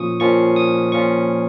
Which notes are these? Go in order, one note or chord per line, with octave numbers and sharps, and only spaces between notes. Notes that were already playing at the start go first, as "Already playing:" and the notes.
Already playing: A#2 F3 A#3 C#4 F4 C#6 D#6
A#2 F3 A#3 C#4 F4 C#6
D#6
A#2 F3 A#3 C#4 F4 C#6